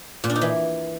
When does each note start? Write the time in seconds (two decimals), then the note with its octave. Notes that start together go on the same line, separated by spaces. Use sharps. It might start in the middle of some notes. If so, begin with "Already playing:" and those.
0.24 A#2
0.30 D4
0.36 D#4
0.41 E3